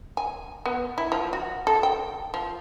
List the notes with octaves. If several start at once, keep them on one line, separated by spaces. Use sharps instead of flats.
G#5
B3
E4
F3
F#4
A4
G5
F3